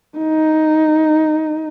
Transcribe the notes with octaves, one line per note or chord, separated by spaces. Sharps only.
D#4